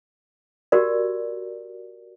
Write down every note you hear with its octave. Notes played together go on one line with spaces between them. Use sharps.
F#4 G4 A#4 D5